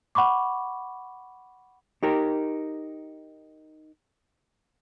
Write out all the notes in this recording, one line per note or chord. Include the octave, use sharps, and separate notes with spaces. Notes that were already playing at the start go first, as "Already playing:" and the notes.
F#5 B5 C#6 D6
D#4 G4 A#4